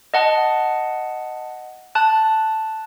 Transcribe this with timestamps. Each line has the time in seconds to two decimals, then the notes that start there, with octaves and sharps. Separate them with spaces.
0.14 D#5 F#5 A5
1.95 A5 F#6